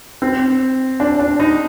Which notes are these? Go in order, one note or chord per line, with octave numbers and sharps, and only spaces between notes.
C4
D4
D4
D#4